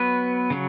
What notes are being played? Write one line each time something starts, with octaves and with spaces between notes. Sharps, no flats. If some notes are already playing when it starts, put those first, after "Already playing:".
Already playing: F#3 B3 B4
C#3 F#3